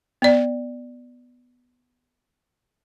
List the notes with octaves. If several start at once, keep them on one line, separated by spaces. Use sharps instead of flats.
B3 D5